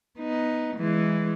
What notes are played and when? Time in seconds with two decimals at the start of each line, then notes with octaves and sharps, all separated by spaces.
0.18 B3 D#4
0.77 E3 G#3